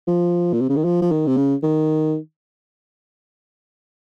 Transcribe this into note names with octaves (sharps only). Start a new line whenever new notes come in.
F3
A#2
C3
C#3
D#3
F3
F3
D#3
C3
C#3
D#3